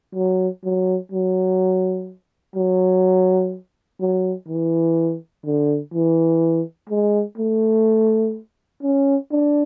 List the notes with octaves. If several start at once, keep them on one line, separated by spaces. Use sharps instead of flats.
F#3
F#3
F#3
F#3
F#3
E3
D3
E3
G#3
A3
C#4
D4